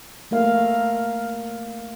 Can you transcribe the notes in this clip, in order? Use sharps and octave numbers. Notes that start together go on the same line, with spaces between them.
A3 A#3 A#4 F5